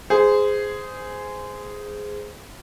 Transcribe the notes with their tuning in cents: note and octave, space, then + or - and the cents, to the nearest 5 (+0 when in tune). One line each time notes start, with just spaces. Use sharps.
G#4 +0 C5 -20